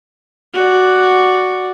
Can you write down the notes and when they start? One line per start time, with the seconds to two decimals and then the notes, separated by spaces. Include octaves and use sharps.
0.54 F#4 D5